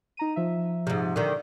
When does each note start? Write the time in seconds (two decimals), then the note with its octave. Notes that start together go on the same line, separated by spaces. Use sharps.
0.17 D#4 A#5 D#7
0.36 F3 E5
0.87 G#2 C3
1.16 D3 D#3